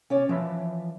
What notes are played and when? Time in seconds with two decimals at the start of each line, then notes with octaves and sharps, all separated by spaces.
0.10 C#4 C#5 D5
0.29 E3 F3 E5 B5